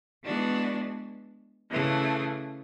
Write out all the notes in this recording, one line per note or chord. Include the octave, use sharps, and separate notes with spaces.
E3 G#3 B3 D4 F#4
C#3 E3 A3